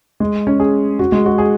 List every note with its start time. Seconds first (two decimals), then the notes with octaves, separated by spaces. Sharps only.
0.20 G#3
0.47 C#4
0.60 G#4
0.99 F#4
1.12 G#3
1.26 F#4
1.38 G#4